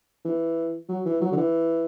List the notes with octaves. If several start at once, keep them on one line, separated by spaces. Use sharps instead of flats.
E3
F#3
E3
F#3
D3
E3